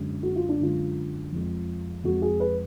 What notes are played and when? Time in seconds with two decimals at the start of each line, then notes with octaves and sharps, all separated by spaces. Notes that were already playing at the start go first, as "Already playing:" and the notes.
Already playing: F#2 D3 G#3
0.23 F#4
0.36 F4
0.49 D4
0.59 F#2 D3 G#3 F4
1.32 F2 F3 G#3
2.04 F2 F3 G#3 F#4
2.22 G#4
2.40 B4